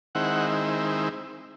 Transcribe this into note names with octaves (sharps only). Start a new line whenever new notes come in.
D#3 G#3 C4 E4 F#5